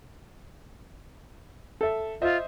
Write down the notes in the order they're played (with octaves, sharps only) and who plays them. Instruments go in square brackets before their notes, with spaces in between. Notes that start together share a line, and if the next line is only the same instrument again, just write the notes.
[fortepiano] A4 E5
[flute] F4 [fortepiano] C5 D#5 E5